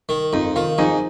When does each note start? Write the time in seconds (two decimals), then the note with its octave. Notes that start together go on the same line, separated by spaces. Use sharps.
0.09 D#3
0.33 F2 D#4
0.56 D#3 F4
0.78 F2 D#4 G#4